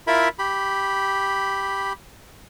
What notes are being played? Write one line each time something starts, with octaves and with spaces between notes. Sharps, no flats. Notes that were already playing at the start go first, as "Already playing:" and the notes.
E4 F4 A#4 E5 B5
G4 B5